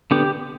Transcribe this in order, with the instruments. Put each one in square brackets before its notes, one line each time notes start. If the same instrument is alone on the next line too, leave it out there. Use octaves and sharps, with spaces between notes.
[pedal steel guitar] D3 B3 D4 G4